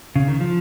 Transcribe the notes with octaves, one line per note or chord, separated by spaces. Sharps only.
C#3
D#3
F3